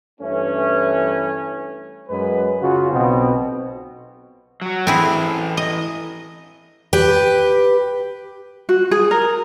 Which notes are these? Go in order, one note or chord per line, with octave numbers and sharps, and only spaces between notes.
G2 E3 A3 C#4
F#2 G#3 B4
C#3 F4 F#4
B1 B2 C4
F#3 F#4
E3 C4 E4 G#4 A4
D#5
G4 B4
F#4
G#4
A#4